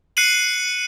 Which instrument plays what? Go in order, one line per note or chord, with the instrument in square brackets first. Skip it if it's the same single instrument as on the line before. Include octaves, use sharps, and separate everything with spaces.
[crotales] F#6 C7 C#7 D#7 F#7